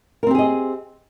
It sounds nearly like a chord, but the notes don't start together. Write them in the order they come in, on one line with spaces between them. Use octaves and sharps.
A#4 C4 G4 G#4 D#5